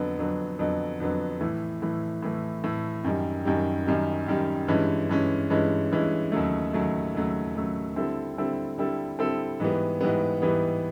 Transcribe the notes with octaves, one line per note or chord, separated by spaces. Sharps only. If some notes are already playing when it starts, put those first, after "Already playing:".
Already playing: F2 D3 F#3 B3
F2 D3 F#3 B3
F2 D3 F#3 B3
F2 D3 F#3 B3
A2 E3 A3
A2 E3 A3
A2 E3 A3
A2 E3 A3
F#2 D#3 G3
F#2 D#3 G3
F#2 D#3 G3
F#2 D#3 G3
G2 E3 G#3 C#4
G2 E3 G#3 C#4
G2 E3 G#3 C#4
G2 E3 G#3 C#4
D#2 C#3 F#3 A3
D#2 C#3 F#3 A3
D#2 C#3 F#3 A3
D#2 C#3 F#3 A3
D3 G3 C4 E4 A4
D3 G3 C4 E4 A4
D3 G3 C4 E4 A4
D3 G3 C4 E4 A4
G#2 E3 G3 B3
G#2 E3 G3 B3
G#2 E3 G3 B3